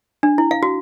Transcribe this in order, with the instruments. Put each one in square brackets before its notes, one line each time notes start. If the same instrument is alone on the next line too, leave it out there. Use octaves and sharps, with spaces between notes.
[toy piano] D4
E4
F5
F#4